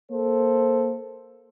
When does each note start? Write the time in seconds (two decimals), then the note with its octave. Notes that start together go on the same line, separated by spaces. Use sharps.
0.11 A#3 A4 C5